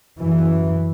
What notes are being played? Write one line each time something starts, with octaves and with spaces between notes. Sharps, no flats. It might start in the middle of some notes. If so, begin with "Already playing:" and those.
F#2 E3